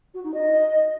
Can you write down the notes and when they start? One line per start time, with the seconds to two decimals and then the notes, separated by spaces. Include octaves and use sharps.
0.14 F#4
0.24 D#4
0.34 D#5